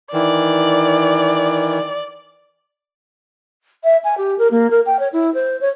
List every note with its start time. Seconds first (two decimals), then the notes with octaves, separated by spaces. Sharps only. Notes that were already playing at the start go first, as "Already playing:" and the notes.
0.13 D#3 E3 D5
3.84 E5
4.04 G#5
4.18 G4
4.39 A#4
4.51 A#3
4.71 A#4
4.86 G5
4.99 C#5
5.13 E4
5.34 C5
5.61 C#5